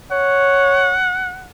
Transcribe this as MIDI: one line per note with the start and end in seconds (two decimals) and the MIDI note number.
0.11 0.97 73
0.11 1.48 78